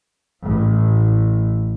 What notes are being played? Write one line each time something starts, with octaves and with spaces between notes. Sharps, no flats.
A1 A2